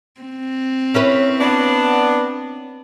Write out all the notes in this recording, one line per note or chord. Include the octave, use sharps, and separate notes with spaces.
C4
C#4 E4 B4
B3 D4